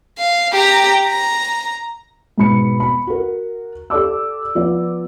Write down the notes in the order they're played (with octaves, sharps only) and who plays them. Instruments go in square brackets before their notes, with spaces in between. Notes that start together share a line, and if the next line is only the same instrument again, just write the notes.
[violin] F5
G4 A#5
A#5
[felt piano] G#2 B2 B5 C#7
B5
F#4 A#4
G4 A4 D5 D6 E6
F3 B3 D5